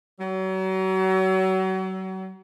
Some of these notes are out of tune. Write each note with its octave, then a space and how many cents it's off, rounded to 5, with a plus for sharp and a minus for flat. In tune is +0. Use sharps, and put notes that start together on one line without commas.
F#3 +35